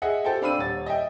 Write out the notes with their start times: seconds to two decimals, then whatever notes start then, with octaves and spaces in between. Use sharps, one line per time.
0.02 G#4 D#5 E5 F#5
0.24 G4 A4 C5 G5
0.41 C4 D4 F5 B5 E6 D#7
0.58 D#1 C#5 A6
0.86 D#5 E5 G5